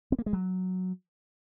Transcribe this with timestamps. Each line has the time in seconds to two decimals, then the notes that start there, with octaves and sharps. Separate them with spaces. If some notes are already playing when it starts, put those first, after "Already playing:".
0.12 C4
0.19 A#3
0.26 G#3
0.33 F#3